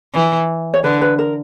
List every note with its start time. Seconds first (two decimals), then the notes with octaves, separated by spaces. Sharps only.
0.14 E3
0.74 C#5
0.84 D3 B4
1.01 B4
1.19 A#4